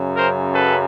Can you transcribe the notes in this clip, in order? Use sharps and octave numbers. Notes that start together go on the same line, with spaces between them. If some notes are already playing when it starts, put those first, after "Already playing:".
Already playing: F#2 C#3 F#3
A#4 C5
A4 B4